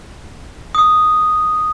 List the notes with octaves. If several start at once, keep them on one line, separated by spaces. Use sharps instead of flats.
D#6